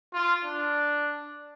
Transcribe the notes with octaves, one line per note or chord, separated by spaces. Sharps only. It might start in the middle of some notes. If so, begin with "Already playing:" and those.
F4
D4